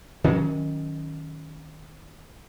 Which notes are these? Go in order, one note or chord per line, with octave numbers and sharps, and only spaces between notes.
D#3 F#3 C#4